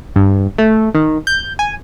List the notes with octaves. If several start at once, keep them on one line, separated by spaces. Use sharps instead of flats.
G2
A3
D#3
G6
G#5